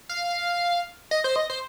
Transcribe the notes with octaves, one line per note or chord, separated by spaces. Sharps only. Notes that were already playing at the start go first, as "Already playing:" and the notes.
F5
D#5
C5
D#5
C5